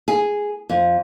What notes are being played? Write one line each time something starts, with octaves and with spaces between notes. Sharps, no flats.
G#4
F2